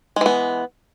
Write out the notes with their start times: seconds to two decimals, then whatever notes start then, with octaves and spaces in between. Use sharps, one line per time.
0.16 G#3
0.21 E3
0.26 B3